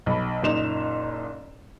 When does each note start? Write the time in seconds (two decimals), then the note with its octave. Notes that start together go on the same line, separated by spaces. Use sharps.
0.06 B1 B5
0.42 F#1 A#2 D#4 E7 F7